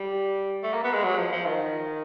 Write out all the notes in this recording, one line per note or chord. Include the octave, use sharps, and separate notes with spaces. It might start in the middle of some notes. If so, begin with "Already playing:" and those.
Already playing: G3
A3
A#3
B3
G#3
F#3
F3
F3
D#3